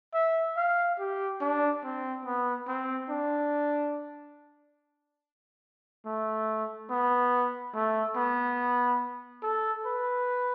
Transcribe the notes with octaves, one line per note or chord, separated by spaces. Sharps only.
E5
F5
G4
D4
C4
B3
C4
D4
A3
B3
A3
B3
A4
B4